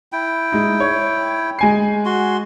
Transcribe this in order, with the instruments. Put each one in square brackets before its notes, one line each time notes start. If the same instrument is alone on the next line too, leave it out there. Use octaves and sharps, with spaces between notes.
[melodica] E4 G5
[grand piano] G#3 D#4
C#5
G#3 G#5 C7
[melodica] F#4 C6